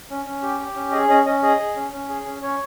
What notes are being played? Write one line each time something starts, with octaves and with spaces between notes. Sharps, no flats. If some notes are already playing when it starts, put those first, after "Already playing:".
C#4
C#4
G4
G4
C#4
G#4 D#5
C#4 D#5
C#4 D#5
G#4 D#5
G#4
C#4
C#4
G#4
C#4
C#4 C#5